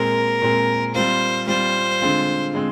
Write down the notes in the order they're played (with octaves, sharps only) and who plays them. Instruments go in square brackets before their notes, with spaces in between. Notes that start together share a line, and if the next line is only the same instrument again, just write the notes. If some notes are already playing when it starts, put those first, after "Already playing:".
Already playing: [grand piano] A#2 G#3 C4 [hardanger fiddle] A#4
[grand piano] A#2 G#3 C4
[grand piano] G3 C4 F4 [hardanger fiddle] C5
[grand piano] G3 C4 F4 [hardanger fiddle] C5
[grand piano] D3 G#3 C4 F4
D3 G#3 C4